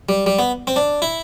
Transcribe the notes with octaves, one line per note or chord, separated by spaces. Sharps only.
G3
G3
B3
C4
D4
E4